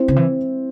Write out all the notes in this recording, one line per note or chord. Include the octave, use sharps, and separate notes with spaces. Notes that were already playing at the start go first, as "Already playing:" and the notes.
Already playing: C4 E4
C#3
E3